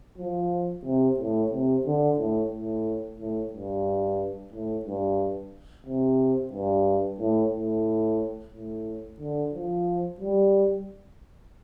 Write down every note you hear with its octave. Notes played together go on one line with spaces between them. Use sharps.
F3
C3
A2
C3
D3
A2
A2
A2
G2
A2
G2
C3
G2
A2
A2
A2
D3
F3
G3